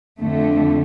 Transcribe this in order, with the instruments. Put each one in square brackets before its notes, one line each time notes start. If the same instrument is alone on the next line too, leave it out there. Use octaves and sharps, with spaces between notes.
[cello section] F2 D3 A3